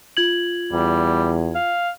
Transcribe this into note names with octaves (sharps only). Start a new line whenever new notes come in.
F4 G#6 F#7
E2 G3
F5